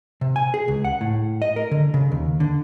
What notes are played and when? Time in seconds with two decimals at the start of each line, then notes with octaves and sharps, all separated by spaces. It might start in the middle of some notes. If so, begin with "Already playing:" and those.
0.21 C3
0.36 G#5
0.54 G#4
0.68 C#2
0.85 F#5
1.01 A2
1.42 D#5
1.56 A#4
1.71 D3
1.94 C#3
2.12 D#2
2.40 D3